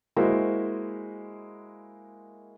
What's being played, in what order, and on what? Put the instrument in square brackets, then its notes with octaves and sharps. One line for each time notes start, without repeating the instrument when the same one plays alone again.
[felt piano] G#3 A#3 E4 F#4 A#4 C5